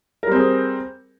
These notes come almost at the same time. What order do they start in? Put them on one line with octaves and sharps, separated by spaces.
A#4 G3 C4 G#4